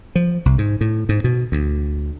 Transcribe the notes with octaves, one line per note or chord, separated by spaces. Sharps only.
F3
C2
G#2
A2
G#2
B2
D2